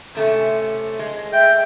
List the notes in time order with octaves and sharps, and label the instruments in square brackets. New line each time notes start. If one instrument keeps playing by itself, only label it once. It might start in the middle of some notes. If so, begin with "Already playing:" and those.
[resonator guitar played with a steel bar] C3 A3 C#4
G#3
[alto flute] E5 [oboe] G5